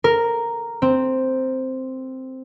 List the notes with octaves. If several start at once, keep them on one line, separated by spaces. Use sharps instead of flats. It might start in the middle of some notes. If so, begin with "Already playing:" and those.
A#4
C4